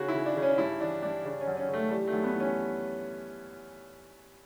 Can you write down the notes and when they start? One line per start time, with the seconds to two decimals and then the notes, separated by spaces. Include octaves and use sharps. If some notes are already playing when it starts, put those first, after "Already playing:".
Already playing: C#3 F#4
0.08 E4
0.14 C#3
0.26 D4
0.36 C#3
0.43 C#4
0.58 G2 E4
0.80 E3 D4
1.02 G2 D4
1.25 C#3 D4
1.41 C#4
1.47 F#2
1.57 C#4
1.68 C#3
1.74 A3
1.90 E3 G3
2.08 F#2 A3
2.24 B3
2.35 E3
2.40 C#4